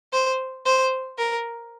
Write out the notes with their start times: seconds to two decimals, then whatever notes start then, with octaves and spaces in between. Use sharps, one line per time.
0.13 C5
0.66 C5
1.18 A#4